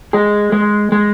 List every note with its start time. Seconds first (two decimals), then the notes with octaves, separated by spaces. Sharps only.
0.13 G#3 G#4
0.52 G#3
0.92 G#3